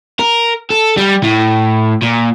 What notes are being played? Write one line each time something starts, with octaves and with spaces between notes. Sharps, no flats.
A#4
A4
G3
A2
A#2